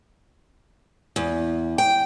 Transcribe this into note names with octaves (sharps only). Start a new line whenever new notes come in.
E2
G5